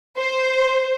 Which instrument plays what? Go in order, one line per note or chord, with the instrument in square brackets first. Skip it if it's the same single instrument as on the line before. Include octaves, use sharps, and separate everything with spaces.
[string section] C5